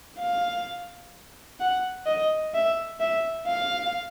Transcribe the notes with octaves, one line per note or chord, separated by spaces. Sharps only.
F5
F#5
D#5
E5
E5
F5